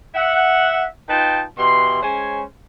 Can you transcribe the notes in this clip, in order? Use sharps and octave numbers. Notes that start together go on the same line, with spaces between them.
E5 F#5
D#4 F4 B4 G5 A5
B2 E3 G4 C6
G#3 C#4 C5 C#5 G#5